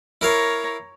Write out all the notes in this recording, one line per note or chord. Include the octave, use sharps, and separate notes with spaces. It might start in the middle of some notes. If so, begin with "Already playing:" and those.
E4 A#4 C#5 F5 A#5